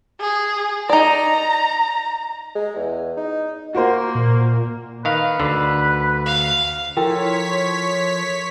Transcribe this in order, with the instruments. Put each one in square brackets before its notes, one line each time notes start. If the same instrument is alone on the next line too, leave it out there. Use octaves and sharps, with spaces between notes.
[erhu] G#4
[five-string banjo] D#4 D5 [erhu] A#5
[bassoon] G#3
E2
D#4
[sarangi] A#3 [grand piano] F#4 A#4 C5
[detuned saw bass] A#2
[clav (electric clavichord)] D#3 F5 [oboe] B4
[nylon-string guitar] D2 [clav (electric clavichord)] D3
[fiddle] F5
[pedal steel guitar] F3 [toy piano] E4 G5 E6 [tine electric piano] A4 A#4 [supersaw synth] C#5 B6